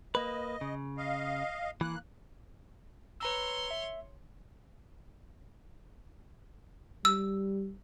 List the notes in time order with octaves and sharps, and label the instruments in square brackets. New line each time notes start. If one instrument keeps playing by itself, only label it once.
[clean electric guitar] A#3 B4 [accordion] D#5
[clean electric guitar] C#3
[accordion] D#5 F5
[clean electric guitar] E3 [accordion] A#3 F#6
[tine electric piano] B4 A#5 E6 [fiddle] C#5 C6
[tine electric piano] E5
[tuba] G3 [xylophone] E6